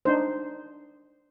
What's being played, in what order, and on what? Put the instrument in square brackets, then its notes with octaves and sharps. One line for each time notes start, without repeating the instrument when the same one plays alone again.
[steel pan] D4 D#4 C5